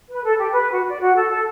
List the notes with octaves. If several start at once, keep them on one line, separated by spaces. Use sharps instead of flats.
B4
A4
G4
B4
F#4
D5
F#4
A4
A4